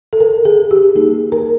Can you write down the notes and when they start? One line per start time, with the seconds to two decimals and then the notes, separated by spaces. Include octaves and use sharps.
0.13 A4
0.20 A#4
0.45 G#4
0.71 G4
0.95 G3 A#3 D#4 G#4
1.32 A#4